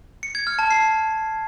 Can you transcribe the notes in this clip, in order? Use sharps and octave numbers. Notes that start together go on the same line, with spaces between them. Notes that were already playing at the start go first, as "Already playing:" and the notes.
C#7
G#6
F6
A5
C7